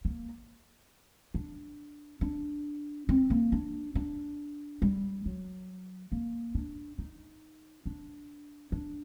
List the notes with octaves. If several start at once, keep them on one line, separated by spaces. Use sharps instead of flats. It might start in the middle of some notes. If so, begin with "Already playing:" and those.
A#3
D4
D4
C4
A#3
D4
D4
G3
F#3
A#3
D4
D#4
D4
D4